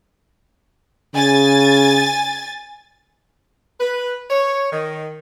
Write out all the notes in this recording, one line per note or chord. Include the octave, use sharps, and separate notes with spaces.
C#3 G#5 A6
B4
C#5
D#3